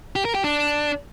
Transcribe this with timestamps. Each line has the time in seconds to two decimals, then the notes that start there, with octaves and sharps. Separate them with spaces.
0.16 G4
0.25 A#4
0.35 G4
0.44 D4